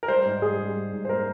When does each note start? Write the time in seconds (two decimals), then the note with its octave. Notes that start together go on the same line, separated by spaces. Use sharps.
0.03 A#4
0.08 G3 C5
0.25 G#2
0.42 G3 G#4
0.59 G3
0.76 G3
0.92 G#2
1.05 C5
1.09 A#3 A#4